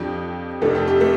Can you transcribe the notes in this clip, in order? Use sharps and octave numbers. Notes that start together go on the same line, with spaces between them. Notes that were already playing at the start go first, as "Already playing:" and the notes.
Already playing: F2 F3 D4 G4
F1 F2 C3 A3 D4 A4
G4
G4
A3 A4